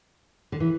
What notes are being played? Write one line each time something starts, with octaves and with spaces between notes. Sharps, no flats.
D3
E3